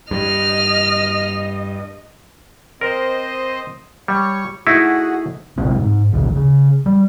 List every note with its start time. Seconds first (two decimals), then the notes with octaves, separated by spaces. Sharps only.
0.11 G2 D#5 F6
2.81 C4 A#4 C5 D#5
4.08 G3 C#5 C#6
4.67 A3 D#4 E4 F#4 G#4
5.58 A#1 C3 G#3 C4
5.79 G#2
6.13 A1 D2 B2 D3
6.35 C#3
6.86 G3